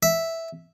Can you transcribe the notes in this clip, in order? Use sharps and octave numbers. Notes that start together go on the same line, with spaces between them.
E5